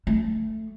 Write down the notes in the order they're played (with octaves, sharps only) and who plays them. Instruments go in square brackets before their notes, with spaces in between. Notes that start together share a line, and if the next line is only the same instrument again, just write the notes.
[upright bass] A3